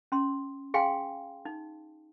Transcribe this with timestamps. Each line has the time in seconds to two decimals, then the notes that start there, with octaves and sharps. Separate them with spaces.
0.12 C#4 C6
0.74 G#4 F5 G5 G#5 C6
1.45 D#4